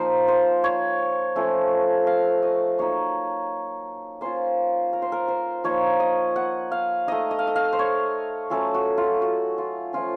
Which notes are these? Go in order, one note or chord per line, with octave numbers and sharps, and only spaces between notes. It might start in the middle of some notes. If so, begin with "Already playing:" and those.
Already playing: F3 A#3 D#4 C5
C5
C#5
F3 A3 C#4
F5
D#5
F#3 A#3 D#4 C#5
A#3 C#4 F4 C5
A#4
C5
A#4
C5
F3 A#3 D#4 C#5
D#5
F#5
F5
A3 D#4 D#5
D#5
F5
D#5
F5
C5
C#5
F#3 A3 C#4 F4 A4
F#4
F4
F#4
F4
F3 A3 C#4 F4